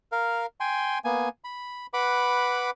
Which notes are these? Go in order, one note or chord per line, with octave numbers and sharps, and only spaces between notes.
A#4 F5
G5 G#5 C6
A#3 B3 G#5
B5
B4 F#5 B5 D6